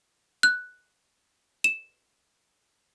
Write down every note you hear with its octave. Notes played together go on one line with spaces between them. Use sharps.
F#6
E7